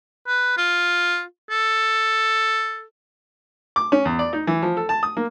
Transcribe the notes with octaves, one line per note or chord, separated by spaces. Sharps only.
B4
F4
A4
D6
C#4
E2
D5
D#4
E3
F3
A4
A5
D#6
A#3